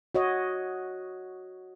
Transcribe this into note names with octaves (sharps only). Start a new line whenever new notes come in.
F#4 C#5 D#5